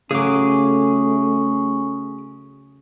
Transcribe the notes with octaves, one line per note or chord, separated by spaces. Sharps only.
C#3 F#3 A3 C#4 G#4 D6